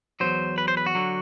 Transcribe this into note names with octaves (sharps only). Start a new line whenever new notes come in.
E2 C3 F#3 C5
B4
C5
B4
F#4
D3 F#3